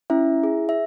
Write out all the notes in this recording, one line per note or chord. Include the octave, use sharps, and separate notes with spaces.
C#4 E4 E5
G#4
E5